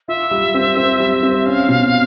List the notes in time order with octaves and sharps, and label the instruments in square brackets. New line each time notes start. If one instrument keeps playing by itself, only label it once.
[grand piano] F4 [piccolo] E5
[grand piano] G3
C4
C4
G3
C4
[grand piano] C#4 [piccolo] F5
[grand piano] B2